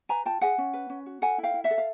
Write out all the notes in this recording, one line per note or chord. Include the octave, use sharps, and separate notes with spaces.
B4 G#5 A#5
F4 G5 A5
G#4 F#5 G#5
C#4
B4
C#4
F#4
A4 F#5 G#5
E4
F5 G5
E4
E5 F#5
A4
F5